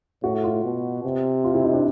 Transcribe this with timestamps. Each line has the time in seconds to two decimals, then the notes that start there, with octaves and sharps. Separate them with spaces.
0.24 A2 F#4
0.44 F4
0.64 B2
1.04 C3
1.44 F4
1.54 E4
1.64 D#4
1.73 D4